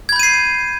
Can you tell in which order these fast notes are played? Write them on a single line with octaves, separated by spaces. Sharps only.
G#6 B5 G6 D#7 C7